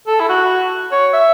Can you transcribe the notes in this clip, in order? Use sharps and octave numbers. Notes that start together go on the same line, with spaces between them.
A4
E4
F#4
C#5
E5